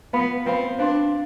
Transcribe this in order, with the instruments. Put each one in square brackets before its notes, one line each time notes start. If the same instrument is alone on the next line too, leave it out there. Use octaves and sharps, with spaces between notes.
[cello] B3 [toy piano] F4 B4 F5 B5
[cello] C4 [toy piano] F4 B4 F5 B5
[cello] D4 [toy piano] C5 F5 C6